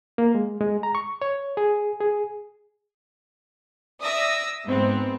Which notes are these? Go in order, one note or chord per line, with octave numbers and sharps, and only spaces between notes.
A#3
G#3
G#3
A#5
C#6
C#5
G#4
G#4
D5 E5 D#6 E6 A#6
G#2 B3 C4